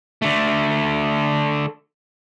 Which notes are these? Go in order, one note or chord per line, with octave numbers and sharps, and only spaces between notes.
D3 A3